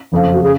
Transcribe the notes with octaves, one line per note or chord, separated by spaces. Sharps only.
F#1 F2 F3
F#4
C#3 G#4